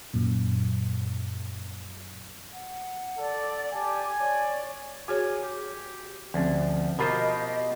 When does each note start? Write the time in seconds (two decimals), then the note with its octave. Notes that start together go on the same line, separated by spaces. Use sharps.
0.14 F#2 A#2
2.53 F#5
3.18 A4 D5
3.73 G4 D5 G#5 A5
4.19 C#5 D5
5.08 F#4 G#4 C#5 G#5
5.43 G4
6.34 D2 F3 C4 C#4
6.99 B2 F4 G4 A#4 C5 D#5 A#5 B5